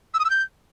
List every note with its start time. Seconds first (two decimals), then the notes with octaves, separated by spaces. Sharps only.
0.14 E6
0.19 D#6
0.25 E6
0.30 G6